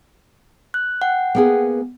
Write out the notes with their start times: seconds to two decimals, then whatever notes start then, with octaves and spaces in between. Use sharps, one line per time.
0.74 F#6
1.02 F#5 G5
1.35 A#3 B3 G#4